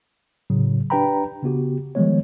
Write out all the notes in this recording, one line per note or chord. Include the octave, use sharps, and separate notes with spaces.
A2 C#3 F#3
D4 G4 B4 G5 A#5 B5
C#3 B3 F#4 G4
D#3 F3 G3 G#3 B3 C#5